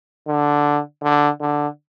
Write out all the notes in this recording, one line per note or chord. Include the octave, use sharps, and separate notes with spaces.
D3
D3
D3